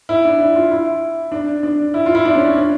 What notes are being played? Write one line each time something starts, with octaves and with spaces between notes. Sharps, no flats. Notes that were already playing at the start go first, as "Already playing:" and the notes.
E4
D4
E4
F4
E4
D4
D4
E4
F4
E4
D4
C#4
D4